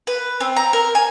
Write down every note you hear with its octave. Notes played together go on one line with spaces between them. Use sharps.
B4
C4
A#5
A#4
G#5